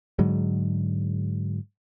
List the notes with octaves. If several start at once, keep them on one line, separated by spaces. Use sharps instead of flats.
G#2 D3 F#3 G#3